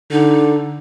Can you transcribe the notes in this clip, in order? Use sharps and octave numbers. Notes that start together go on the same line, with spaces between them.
D3 D#4